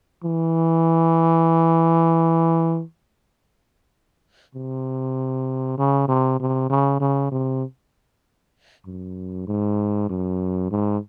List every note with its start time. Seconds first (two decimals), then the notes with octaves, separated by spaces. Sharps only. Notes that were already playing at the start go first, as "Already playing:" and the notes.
0.24 E3
4.55 C3
5.78 C#3
6.08 C3
6.40 C3
6.70 C#3
7.01 C#3
7.32 C3
8.86 F#2
9.48 G#2
10.09 F#2
10.71 G#2